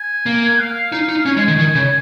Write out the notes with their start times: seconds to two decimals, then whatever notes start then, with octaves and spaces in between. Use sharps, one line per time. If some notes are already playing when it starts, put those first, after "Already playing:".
Already playing: G#5
0.26 A#3
0.59 F5
0.92 D#4
1.09 D#4
1.25 C#4 G#5
1.37 G#3
1.48 D#3
1.59 D#3
1.75 C#3